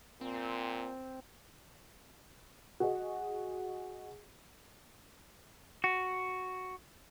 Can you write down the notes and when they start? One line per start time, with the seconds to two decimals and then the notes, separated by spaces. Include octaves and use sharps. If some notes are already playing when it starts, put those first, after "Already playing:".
0.21 A#2 C4
2.80 F#4 G#4 D#5
5.84 F#4